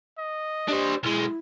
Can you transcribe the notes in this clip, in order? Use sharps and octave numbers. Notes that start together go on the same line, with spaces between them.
D#5
D4 G4 C5
B1 G#3 E4